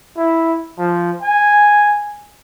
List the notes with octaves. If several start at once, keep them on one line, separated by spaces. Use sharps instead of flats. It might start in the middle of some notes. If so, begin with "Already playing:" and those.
E4
F3
G#5